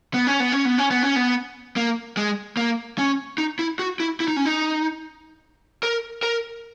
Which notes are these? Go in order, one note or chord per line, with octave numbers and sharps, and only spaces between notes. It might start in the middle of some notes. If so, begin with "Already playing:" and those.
B3
C#4
B3
C#4
B3
C#4
B3
C#4
B3
A#3
G#3
A#3
C#4
D#4
E4
F#4
E4
E4
D#4
C#4
D#4
A#4
A#4